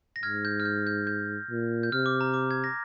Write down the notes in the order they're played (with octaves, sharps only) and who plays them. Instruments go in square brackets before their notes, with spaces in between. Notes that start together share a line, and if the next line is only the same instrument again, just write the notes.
[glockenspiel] A#6
[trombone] G#2 [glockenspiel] F6 G#6
[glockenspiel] G6
F6
G6
G6
G6
[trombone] A#2
[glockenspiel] G6
[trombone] C3 [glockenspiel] F6
[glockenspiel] D6
A#5
D6
G#6
A#6